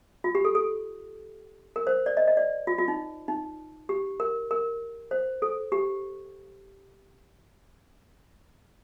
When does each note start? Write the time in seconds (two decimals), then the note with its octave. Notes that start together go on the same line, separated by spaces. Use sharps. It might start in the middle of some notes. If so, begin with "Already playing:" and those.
0.24 F4
0.35 G4
0.45 A4
0.55 A4
1.76 A#4
1.87 C5
2.06 D5
2.17 D#5
2.28 D#5
2.37 D5
2.67 F4
2.78 F4
2.88 D#4
3.28 D#4
3.89 G4
4.20 A#4
4.51 A#4
5.11 C5
5.42 A4
5.72 G4